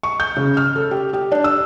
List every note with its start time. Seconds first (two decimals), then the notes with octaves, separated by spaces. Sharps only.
0.03 C#6
0.20 G6
0.37 C#3
0.57 F6
0.76 A4
0.91 G4
1.13 G4
1.32 D4
1.44 E6